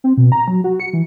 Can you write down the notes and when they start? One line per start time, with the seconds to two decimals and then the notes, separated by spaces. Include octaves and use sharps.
0.04 C4
0.17 B2
0.32 A#5
0.48 F#3
0.64 F#4
0.80 C#7
0.93 E3